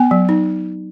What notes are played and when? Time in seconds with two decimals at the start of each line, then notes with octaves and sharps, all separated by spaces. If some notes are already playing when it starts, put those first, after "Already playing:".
Already playing: B3 G#5
0.11 F#3
0.29 D#4